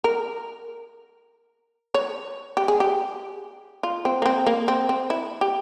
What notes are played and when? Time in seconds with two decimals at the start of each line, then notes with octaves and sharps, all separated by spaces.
0.04 A#4
1.94 C#5
2.57 G4
2.68 G#4
2.80 G4
3.83 F4
4.05 C4
4.22 A#3
4.26 C4
4.47 A#3
4.68 C4
4.89 C4
5.10 E4
5.41 G4